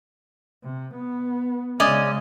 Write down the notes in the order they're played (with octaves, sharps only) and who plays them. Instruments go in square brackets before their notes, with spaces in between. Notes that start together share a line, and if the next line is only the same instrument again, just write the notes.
[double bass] C3
B3
[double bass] C#3 G#3 [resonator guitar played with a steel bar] C#4 D5 D#5